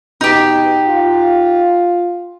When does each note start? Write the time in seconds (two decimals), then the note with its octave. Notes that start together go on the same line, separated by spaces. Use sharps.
0.21 B2 D#4 G4
0.86 F4